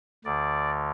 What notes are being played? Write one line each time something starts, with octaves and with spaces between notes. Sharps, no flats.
D2 D3 D5